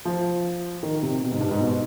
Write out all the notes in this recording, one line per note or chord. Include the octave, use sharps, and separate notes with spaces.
F3
D#3
C3
B2
G#2
G2
G#2
B2